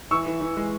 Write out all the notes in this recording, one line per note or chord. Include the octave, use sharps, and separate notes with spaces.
E3 C#6 E6
E3
E3
G#3